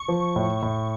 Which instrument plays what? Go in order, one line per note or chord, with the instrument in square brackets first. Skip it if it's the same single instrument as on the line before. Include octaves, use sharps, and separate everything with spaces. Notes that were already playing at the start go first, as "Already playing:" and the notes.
Already playing: [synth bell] C#6
[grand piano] F3
A2
A2